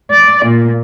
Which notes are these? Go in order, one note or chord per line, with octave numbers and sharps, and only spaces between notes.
D5
A#2